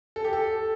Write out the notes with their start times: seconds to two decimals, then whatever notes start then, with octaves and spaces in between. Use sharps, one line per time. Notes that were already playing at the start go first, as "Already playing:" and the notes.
0.16 A4
0.25 G4
0.33 A4